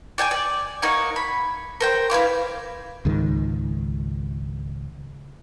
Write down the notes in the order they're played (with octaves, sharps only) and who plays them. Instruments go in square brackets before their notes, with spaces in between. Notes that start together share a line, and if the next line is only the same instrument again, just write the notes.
[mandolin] D5 G5 G#5 D6
D5
A#3 D#4 C#5 F#5
B5
A#4 C5 G5
E4 B4 F5 D6
[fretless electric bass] C#2 G#2 D#3